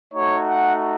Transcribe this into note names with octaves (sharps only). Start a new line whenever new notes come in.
A3 D#4 F#4 C#5
F#5